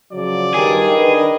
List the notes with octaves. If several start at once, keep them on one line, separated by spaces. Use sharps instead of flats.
C#3 F3 F#3 D5
G2 D#3 G#4
D4 B4 D#5